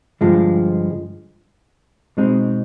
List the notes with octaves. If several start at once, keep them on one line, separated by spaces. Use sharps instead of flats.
G2 D3 F3 G#3
B2 G#3 C4 D#4